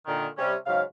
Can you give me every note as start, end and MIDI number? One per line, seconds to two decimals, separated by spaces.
0.07 0.27 46
0.07 0.27 50
0.07 0.27 51
0.38 0.55 48
0.38 0.55 55
0.38 0.55 61
0.67 0.82 44
0.67 0.82 49
0.67 0.82 54
0.67 0.82 77